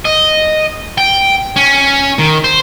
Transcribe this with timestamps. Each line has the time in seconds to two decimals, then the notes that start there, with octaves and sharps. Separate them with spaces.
0.05 D#5
0.98 G5
1.56 C#4
2.19 D#3
2.44 C5